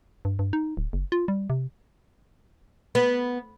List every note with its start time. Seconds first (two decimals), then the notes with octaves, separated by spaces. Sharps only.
0.25 G2
0.39 G2
0.53 D#4
0.77 D1
0.93 F#1
1.12 F4
1.28 G3
1.50 C3
2.95 B3